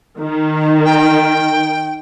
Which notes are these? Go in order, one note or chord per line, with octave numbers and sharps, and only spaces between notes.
D#3
G5